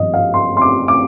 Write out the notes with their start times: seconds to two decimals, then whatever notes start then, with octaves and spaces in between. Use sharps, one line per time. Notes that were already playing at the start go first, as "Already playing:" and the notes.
Already playing: G#1 G2 F3 D#5
0.14 F5
0.34 C6
0.57 C6
0.61 D6
0.88 D6